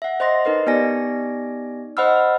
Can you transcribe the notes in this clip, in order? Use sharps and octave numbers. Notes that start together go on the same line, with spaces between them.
E5 F#5
C5 D#5 C6 A#6
D#4 A#4 B4 D#5
B3 D#4 G4 D5 G#5 A#6
C5 D#5 F#5 B5 E6 F6